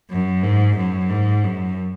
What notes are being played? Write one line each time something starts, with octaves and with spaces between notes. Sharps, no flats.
F#2
G#2
F#2
G#2
F#2